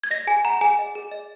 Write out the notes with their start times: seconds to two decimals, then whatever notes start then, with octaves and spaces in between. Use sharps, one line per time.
0.04 G#6
0.11 D#5 A#6
0.27 G#4 G#5
0.45 F#5 A#5
0.61 G#4 G#5
0.79 D#5
0.95 G#4
1.11 D#5